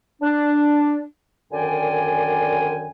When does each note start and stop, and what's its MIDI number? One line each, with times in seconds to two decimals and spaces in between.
0.22 1.01 62
1.52 2.91 42
1.52 2.91 50
1.52 2.91 51
1.52 2.91 74
1.52 2.91 79
1.52 2.91 80